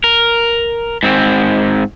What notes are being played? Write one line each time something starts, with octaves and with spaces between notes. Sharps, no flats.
A#4
G#2 C4